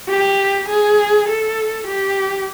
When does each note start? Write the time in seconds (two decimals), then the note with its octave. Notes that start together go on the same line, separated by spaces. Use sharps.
0.09 G4
0.68 G#4
1.28 A4
1.87 G4